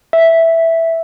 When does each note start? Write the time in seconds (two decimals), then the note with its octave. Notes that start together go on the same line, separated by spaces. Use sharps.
0.13 E5